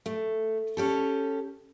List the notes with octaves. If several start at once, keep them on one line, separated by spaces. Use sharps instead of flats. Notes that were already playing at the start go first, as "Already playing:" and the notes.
A3
C#4 G4 A4